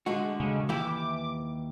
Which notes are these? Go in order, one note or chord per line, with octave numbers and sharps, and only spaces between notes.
D3 G#3 A3 F#4
C#3 G#3
D#2 E3 E4 G4 D6